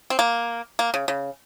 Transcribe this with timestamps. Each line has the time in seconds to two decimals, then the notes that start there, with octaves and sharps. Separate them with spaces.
0.10 C4
0.19 A#3
0.79 A#3
0.94 C#3
1.08 C#3